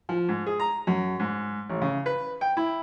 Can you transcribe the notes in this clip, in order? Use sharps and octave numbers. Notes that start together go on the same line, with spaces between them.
F3
G#2
G#4
A#5
F#2
G#2
A1
C#3
B4
G5
E4